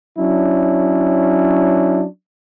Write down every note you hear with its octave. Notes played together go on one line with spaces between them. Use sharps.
F#3 C#4 D4 E4